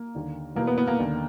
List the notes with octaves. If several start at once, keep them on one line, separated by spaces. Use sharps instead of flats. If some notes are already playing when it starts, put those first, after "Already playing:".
Already playing: A#3
D#2 D3
E2 B2 A#3
B3
B3
A#3
D#2 D3